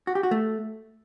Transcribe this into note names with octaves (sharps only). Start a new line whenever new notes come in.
F#4
G4
F#4
A3